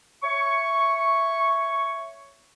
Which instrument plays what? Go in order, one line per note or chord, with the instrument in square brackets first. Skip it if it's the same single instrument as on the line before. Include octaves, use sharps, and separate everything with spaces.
[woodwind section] C#5 E5 C#6